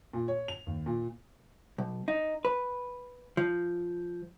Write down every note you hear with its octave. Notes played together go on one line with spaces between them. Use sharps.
A#2
C#5
F7
D#2
A#2
B1
D#4
B4
F3